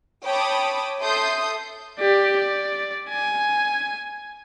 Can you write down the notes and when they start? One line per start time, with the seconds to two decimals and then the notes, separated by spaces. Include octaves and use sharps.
0.24 C#5 G5 A5 B5 D6 D#6
1.00 A4 E5 C6 D#6 G6
2.00 G4 D5
2.37 D5
3.10 G#5